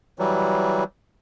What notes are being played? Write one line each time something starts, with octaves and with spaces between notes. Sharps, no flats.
E3 F#3 G3